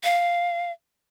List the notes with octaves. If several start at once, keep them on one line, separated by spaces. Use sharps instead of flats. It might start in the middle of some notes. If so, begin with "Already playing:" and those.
F5